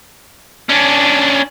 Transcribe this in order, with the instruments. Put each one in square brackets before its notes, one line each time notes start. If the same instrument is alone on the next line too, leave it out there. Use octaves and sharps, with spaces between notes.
[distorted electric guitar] C#4 D4